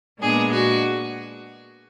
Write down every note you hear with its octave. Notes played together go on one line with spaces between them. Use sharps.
A#2 G#3 B3 D4 G#4
F#4